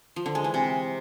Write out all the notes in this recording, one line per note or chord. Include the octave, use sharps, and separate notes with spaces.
F3
D3
G#3
E3
C3